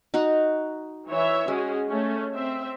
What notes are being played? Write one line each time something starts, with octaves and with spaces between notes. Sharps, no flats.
D#4 F#4 F#5
E3 C#5 E5
G#3 C#4 F#4 G#4
A3 C#4
C4 E5